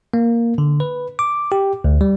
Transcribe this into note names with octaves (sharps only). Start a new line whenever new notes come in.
A#3
D3
B4
D6
G4
D2
G3